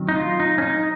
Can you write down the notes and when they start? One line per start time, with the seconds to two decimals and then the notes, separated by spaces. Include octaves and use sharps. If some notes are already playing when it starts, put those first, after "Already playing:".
Already playing: D#3 F#3 C4
0.09 D#4
0.16 F4
0.40 D#4
0.58 C#4
0.62 D#4